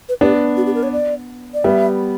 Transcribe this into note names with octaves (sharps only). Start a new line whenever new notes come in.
B4
B3 D4 G4
F#4
G4
A#4
C#5
D5
D5
G3 B3 E5